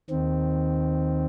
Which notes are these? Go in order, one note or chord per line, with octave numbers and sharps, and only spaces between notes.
D#2 D#3 C4